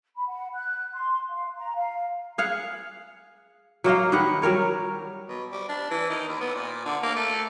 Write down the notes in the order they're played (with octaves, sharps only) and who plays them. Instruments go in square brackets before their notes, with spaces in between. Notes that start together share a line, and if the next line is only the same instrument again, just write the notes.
[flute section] B5
F#5
F#6
C6
F5
A#5
F5
[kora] G#4 F5 F#5
F#3 A#3 D#5 F5
D#3 B3 G4 F#5
F#3 G3 A#4 C#5
[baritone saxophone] B2
G3
D4
E3
D#3
D#2
B3
A#2
D3
A#3
A3